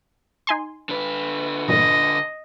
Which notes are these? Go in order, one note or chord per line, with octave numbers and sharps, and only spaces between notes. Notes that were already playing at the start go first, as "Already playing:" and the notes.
D#4 G#5 C6
D3 B4
E2 G2 A#2 D#5